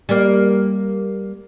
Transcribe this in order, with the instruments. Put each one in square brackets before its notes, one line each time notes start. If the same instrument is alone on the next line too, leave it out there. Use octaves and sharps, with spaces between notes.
[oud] G3 A#3